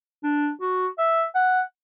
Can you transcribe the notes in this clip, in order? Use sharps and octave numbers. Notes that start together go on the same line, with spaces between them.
D4
F#4
E5
F#5